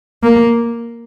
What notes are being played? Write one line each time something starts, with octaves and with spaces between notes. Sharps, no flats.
A#3